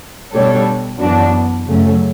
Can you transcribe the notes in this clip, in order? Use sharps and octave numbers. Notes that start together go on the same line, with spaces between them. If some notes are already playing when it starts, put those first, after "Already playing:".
B2 G3 D4 A4 C#5
F#2 E3 B3 D4 F#4
F#2 C#3 F#3 A3 C#4